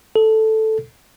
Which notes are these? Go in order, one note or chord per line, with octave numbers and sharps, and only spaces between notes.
A4